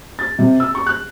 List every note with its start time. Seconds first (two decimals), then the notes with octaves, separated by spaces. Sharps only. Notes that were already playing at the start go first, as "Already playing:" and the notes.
0.19 A6
0.39 C3
0.60 E6
0.75 C#6
0.87 F#6